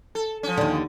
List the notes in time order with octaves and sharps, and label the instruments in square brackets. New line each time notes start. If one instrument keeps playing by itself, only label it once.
[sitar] A4
F3 C#4
[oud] D#2 D3